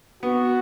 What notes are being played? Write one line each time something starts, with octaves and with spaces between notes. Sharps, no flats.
B3 F#4